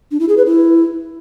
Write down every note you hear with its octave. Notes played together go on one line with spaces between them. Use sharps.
D4
E4
G#4
B4
E4